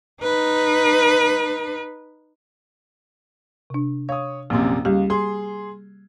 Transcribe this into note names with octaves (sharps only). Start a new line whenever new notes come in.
D#4 B4
C3 D4
C#5 F5 D#6
A#1 F#2 C3 A#3 C6
C#2 G3 G4
G#4 C6